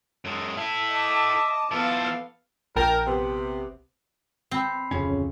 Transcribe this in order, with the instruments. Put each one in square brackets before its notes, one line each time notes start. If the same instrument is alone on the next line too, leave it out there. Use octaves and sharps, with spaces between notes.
[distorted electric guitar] F#2 G#3 [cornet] A4
[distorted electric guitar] E4 A4 [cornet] E5 [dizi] A5
[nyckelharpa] D#5 D6
[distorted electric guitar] F3 E4 [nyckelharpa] B3 F5 [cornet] A4
[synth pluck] A#1 G5 A5 [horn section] A#4
[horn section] C3 B3
[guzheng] C4 [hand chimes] B5 C7
[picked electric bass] D1 F2 C#4 [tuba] C#3